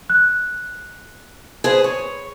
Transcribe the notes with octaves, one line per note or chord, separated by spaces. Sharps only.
F#6
G#4 B4 C5
C#5